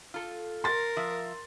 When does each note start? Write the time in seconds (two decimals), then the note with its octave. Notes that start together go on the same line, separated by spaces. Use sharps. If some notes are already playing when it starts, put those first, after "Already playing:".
0.14 F4 A4
0.64 A#4 C6 A6
0.97 F3 E5